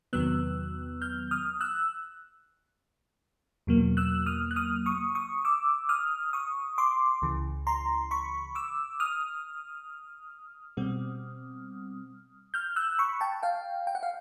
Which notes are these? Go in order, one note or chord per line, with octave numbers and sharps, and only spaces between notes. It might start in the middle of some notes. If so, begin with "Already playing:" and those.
E2 C3 D#3 F#3 B3 E6 F#6
F6 G6
D#6 F6
E6 F#6
E2 B2 F#3 A#3
E6 F#6
D#6 F6
F#6
D#6 F6
C#6 D#6
C#6 D#6
D6 E6
D#6 F6
C#6 D#6
C6 D6
C#2 C#3 E3
A#5 C6
B5 C#6
D6 E6
D#6 F6
B2 G3 C4
F6 G6
E6 F#6
B5 C#6
G5 A5
F5 G5
G5
F#5
F5